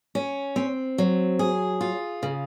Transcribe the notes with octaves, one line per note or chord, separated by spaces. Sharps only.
C#4
C4
F#3
G#4
F4
C#3